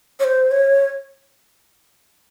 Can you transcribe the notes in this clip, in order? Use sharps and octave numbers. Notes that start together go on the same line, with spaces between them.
C#5
C5
C#5